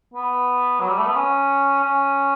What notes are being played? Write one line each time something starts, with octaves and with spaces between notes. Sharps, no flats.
B3
F#3
G3
A3
B3
C#4
C#4